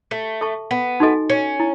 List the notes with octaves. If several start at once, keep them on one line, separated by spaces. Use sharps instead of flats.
A3
A4 E5 A5 C#6
B3
D#4 F#4 A4 D#5 G#5
C#4
E4